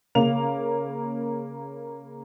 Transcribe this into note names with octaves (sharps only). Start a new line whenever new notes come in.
C#3 A#3 F7